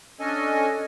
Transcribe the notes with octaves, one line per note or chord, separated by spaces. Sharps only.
C#4 D4 A4 D#5 G#5